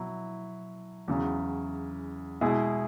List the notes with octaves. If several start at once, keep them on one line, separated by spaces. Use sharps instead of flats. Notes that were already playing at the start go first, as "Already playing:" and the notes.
Already playing: B2 F#3 E4
E2 C#3 F#3
B2 G#3 E4 G#4